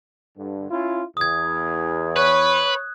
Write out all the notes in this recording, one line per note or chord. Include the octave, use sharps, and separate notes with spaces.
G2 D3
C#4 E4 F4
E2 D#6 G#6
B4 C#5 F#6